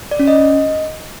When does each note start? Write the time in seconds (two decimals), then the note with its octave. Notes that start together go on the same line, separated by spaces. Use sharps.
0.11 D5
0.19 C#4
0.28 D#5